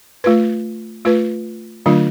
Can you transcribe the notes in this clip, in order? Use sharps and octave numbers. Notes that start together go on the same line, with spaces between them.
A3 F4 B4
A3 F4 B4
D3 F#3 A3 D4 F4